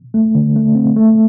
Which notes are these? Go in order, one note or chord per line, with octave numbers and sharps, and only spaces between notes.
A3
D3
A3
C4
A3